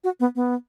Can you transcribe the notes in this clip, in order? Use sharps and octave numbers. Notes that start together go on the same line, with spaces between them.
F#4
B3
B3